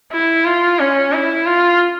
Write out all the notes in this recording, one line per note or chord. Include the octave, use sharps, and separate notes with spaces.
E4
F4
C#4
E4
F4